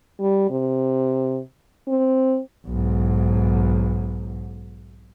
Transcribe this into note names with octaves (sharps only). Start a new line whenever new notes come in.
G3
C3
C4
B1 G#2